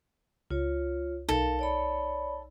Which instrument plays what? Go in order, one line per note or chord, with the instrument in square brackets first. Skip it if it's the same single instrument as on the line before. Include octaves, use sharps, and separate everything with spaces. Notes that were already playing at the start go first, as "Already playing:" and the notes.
[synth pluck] C#2 [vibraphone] F4 C#5
[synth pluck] B1 D#4 [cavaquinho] A4 [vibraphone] A#4 F5
[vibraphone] C#5 D5 B5